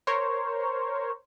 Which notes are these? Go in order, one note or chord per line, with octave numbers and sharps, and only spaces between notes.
A#4 C5 C#5